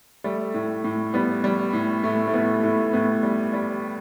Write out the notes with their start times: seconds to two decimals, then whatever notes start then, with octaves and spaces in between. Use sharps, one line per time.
0.24 G3 A3
0.54 A2
0.84 A2
1.14 G3 B3
1.44 G3
1.73 A2
2.03 A2 A3
2.27 A3
2.34 A2 B3
2.63 A2 A3
2.93 A2 B3
3.23 G3
3.53 G3